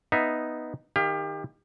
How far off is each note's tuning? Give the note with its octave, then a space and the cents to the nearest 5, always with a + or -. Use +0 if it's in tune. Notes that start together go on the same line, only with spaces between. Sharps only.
B3 +0 D#4 +0 E5 +0
D#3 +0 G4 +30 F5 +0